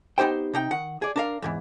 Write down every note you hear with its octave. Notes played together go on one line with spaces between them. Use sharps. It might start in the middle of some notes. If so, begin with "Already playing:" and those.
B3 D#4 G4 C5 G5
C3 D#4 G5
D#3 F#5
G#4 D5
D4 A#4 F5
E2 G#2 E3